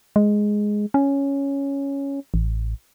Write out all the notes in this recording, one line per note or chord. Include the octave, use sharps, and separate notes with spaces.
G#3
C#4
A1